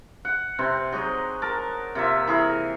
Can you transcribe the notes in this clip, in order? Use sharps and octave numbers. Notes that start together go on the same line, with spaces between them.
F#5
C3 C4 B4 C6
F#3 D#4 G#4 D#5
A#4 A5
C3 A#3 F4 E5
E3 E4 G#4 A#4